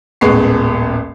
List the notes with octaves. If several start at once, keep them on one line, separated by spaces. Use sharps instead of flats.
D#1 A1 G#3 B3 C#6 C7